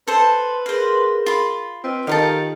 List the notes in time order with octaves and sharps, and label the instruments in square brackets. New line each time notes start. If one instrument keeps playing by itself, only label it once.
[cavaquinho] A4 C5 [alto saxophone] B4
[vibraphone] G#4 A#4 C6 [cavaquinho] C5 F5
[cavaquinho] F4 B5
[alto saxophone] C4 [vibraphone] F4 B4 D#5
[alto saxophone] D#3 [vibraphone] F4 G4 [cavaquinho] A4 A#4 F5